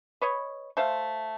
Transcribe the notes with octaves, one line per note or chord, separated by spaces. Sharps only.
B4 C#5 D#5
A3 C5 E5 F5